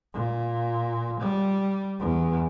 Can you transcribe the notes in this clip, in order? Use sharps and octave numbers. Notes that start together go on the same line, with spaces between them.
A#2
G3
E2